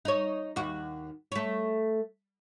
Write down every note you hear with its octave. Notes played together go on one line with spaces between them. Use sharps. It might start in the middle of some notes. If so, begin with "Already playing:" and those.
D#4 C#5
D#2 F#4
A3 C#5